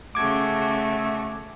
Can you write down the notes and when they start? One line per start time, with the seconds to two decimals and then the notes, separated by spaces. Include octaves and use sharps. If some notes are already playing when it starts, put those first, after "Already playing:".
0.15 C#3 A3 F#4 D6 G#6